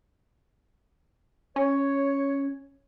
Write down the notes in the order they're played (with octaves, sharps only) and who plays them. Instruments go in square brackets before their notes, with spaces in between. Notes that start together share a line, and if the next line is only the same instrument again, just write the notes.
[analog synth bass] C#4 [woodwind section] C#5